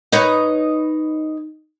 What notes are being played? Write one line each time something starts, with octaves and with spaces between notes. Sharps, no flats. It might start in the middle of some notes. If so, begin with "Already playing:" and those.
D#4 B4 C#5